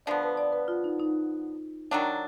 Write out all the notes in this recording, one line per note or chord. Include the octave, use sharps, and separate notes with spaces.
D3 F3 B3 D5
B4
D5
B4
F4
D#4
D#4
D#3 F#3 D4